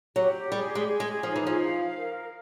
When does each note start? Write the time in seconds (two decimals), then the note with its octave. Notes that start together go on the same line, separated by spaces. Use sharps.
0.16 F#3 G4
0.52 G3 G#4
0.75 G#3
0.87 G#4
1.00 G#3
1.23 F3 D#4
1.36 E3
1.47 F3
1.60 F5
1.95 A#4